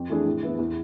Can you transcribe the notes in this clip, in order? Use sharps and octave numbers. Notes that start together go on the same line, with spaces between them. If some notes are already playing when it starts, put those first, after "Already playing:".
Already playing: F2
E3 A3 D4 G#4
A2
E3 B3 E4
E2